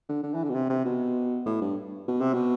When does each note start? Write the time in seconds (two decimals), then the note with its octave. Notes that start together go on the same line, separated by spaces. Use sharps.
0.09 D3
0.23 D3
0.34 E3
0.44 D3
0.49 B2
0.55 C3
0.69 C3
0.85 B2
1.46 A2
1.61 G2
2.08 B2
2.21 C3
2.34 B2